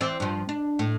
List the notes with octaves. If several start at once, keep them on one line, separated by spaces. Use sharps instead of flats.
E3 C4 D5
G2 F3
D4
A2